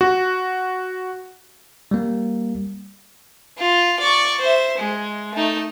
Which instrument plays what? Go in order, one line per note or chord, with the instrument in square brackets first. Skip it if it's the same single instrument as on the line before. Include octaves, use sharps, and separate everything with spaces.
[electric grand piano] F#4
[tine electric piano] G3 A#3
[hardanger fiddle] F4
D5 C#6
C5 E5
G#3
A3 D#4